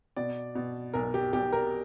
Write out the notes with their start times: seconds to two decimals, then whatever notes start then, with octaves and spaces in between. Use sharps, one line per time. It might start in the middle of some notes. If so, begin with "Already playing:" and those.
0.16 B2 D5
0.55 B2
0.94 B1 A#4
1.14 G4
1.33 B1 G4
1.52 A#4